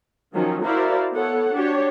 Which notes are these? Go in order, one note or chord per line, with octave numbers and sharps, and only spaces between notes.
D#3 F3 F#3 C#4
E4 F#4 A#4 C5 D5 F5
B3 A4 C#5 F#5
D4 F#4 G4 C#5